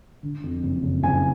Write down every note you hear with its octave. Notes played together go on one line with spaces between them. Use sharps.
D3
F2
F#1
F#1
F#1 G#5